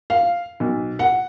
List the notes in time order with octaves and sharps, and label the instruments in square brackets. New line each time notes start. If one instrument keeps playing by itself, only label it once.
[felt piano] F5
B1
F#5